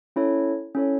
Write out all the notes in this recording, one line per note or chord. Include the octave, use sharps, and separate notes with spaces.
C#4 E4 A4 C#5
C#4 E4 A4 C#5